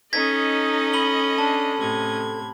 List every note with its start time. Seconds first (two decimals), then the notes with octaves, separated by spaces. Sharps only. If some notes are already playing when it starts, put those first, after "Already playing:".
0.13 C#4 D#4 A4 D#5 G#6 A#6 B6
0.93 B5 F#7 G7
1.38 D4 A5
1.81 A2 C3 G#6